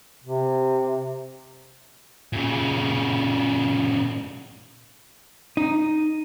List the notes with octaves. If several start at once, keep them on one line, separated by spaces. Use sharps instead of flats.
C3
A#2 C#3
D#4